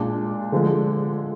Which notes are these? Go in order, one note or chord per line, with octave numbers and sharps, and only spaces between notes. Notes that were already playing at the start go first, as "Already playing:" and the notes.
Already playing: A#2 G#3 D4
D3 F3 G#3